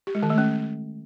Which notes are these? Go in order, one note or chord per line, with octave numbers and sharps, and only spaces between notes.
G4
G#3
D#3
A3
C#4